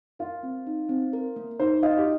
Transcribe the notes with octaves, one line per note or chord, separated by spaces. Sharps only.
F4 A#4
C4
D#4
C4
A#4
A#3
D#4 C5
F4 D#5
G4